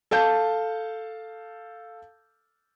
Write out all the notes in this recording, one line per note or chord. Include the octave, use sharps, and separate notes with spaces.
A4 F5 A5 G6